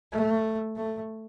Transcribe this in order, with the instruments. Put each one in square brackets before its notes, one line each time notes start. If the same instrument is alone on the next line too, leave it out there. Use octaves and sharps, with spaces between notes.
[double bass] A3
A3